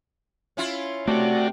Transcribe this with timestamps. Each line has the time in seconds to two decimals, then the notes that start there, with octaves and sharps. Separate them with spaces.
0.57 C#4 E4 F4
1.08 A3 C4 F#4 G4 D5